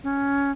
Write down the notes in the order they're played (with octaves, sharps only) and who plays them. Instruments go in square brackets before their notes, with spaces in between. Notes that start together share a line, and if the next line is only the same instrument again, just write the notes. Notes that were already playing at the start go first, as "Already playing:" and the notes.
[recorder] C#4